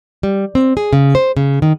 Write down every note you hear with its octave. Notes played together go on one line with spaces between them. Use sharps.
G3
C4
G#4
C#3
C5
C#3
D#3